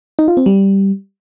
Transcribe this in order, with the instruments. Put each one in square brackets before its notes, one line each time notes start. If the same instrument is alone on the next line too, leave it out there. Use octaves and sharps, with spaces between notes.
[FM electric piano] D#4
F4
C4
G3